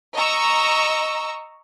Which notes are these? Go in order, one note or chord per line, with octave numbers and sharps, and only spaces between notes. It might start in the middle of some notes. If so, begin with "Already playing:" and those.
D#5 A#5 C#6 E6